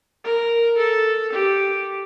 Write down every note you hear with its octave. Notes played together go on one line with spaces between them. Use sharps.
A#4
A4
G4